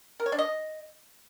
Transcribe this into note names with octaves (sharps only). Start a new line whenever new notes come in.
A#4
C#5
D4
D#5